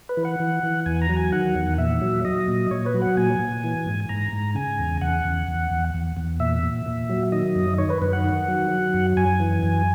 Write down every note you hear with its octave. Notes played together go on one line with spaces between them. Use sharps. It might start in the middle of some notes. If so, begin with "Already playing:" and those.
B4
E3
F#5
E3
E3
E2 G#5
A#5
F#3
G#5
D#3 F#5
E2
A#2 E5
F#3
F#3 D#5
A#2
A#2 C#5
B4
F#3
F#5
A#2 G#5
A#2
E3
G#2
G#2 A#5
G#2
C#3 G#5
E2
E2 F#5
E2
E2
E2
E2
E2
A#2 E5
A#2
A#2
F#3
D#3 D#5
F#2
D#3 C#5
B4
F#2 B4
F#5
D#3
F#3
F#3
F#2
F#2 G#5
E3
F#2